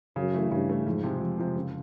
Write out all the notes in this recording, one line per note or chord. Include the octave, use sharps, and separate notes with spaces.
F#2 C#3
E3 A3
G2 C#3
E3 A3
F2 G#2
C3 F3 G#3
F2
C3 F3 G#3
F#1